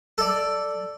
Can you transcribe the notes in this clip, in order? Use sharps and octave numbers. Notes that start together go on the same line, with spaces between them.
A4 D5